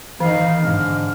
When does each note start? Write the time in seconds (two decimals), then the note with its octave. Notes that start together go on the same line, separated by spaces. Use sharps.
0.20 D#3 E3 D#4 F5
0.60 G#2 D3 F6